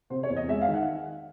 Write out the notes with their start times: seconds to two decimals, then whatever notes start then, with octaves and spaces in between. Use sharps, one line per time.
0.10 C3 C5
0.23 C#5
0.29 E2
0.37 D#5
0.48 G#3 E5
0.62 F5
0.68 D#3
0.74 F#5